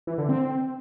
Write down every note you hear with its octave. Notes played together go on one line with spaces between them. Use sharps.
E3
D3
C4